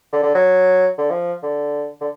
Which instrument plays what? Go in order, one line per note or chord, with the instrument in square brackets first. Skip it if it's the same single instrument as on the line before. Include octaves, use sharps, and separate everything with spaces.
[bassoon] D3
D3
F#3
D3
F3
D3
D3